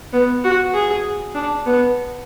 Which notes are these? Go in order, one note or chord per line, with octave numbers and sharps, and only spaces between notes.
B3
F#4
G#4
D4
B3